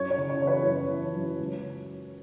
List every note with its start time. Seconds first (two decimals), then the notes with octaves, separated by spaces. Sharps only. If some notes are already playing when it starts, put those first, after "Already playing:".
Already playing: F#2 C#5
0.10 C#5
0.17 C#3
0.29 C#5
0.41 E3 C#5
0.47 B4
0.65 F#2 C#5
0.90 E3
1.15 F#2
1.40 C#2